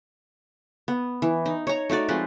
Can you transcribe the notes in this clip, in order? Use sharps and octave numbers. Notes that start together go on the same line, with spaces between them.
B3
E3
D#4
C#5 A#5
A3 D#4 F#4 D5
F3 G#3 C4 B4